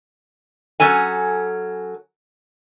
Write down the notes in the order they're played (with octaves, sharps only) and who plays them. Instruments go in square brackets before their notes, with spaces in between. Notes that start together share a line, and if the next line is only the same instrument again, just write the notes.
[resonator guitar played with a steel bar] F#3 C#4 A4 G#5